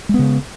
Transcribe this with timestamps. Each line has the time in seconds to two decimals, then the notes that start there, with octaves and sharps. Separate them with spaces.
0.09 G#3
0.14 B3
0.19 C#3